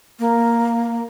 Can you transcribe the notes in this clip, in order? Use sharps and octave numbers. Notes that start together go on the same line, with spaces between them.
A#3